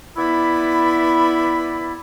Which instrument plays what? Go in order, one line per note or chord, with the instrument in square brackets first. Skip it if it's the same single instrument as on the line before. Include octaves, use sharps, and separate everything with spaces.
[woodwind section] B3 E4 D5 E5 B5